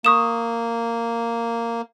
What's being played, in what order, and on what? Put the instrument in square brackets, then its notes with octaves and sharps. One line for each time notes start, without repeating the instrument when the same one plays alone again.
[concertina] A#3 [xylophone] C#6 D#6 E7